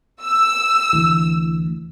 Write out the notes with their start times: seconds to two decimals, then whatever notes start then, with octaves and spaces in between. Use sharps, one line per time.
0.23 E6
0.93 D2 E3